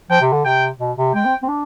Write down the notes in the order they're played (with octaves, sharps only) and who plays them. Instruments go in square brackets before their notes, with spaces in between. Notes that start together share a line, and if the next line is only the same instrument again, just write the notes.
[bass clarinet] F3 [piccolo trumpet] G5
[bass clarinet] C3
D3
[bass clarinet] C3 [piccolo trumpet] G5
[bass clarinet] B2
C3
[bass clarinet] G#3 [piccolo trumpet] G5
[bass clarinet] C4
C4
D4